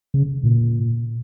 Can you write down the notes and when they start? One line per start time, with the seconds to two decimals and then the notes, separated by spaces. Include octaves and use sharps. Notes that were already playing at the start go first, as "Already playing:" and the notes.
0.14 C#3
0.44 A#2